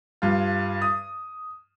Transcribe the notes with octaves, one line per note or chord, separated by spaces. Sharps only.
G2 F4
D#6